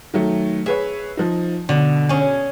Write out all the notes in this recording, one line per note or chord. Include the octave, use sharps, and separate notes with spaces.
D#3 F#3 A3
G#4 B4 C#5 E5
F3 D#4
B2 D3
C#4 G#4